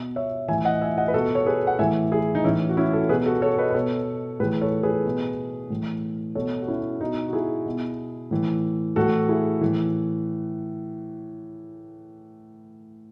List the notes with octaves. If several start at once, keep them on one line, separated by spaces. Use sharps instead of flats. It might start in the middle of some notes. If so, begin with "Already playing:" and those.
Already playing: B2
C#5 E5
A2 E3 E5 G#5
D#5 F#5
E5 G#5
D#5 F#5
B4
B2 F#4 A4
C#5
G#4 B4
F#5
A2 E3 E5 G#5
E4 G#4
D#4
A2 E3 C#4 E4
F#4
C#4 E4
F#4 A4
B2 G#4 B4
F#4 A4
A4 C#5
B4 D#5
B4
B2 A4 C#5
A2 E3 G#4 B4
A4 C#5
G#4 B4
B2
A2 E3
B2 A4 C#5
F#4
C#4 E4
B2 D#4 F#4
F#4
E4 G#4
B2
A2 E3
A2 E3 F#4 A4
E4 G#4
A2 E3